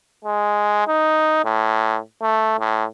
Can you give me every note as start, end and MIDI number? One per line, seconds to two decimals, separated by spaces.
0.25 0.86 56
0.87 1.41 63
1.44 1.98 45
2.22 2.56 57
2.59 2.85 45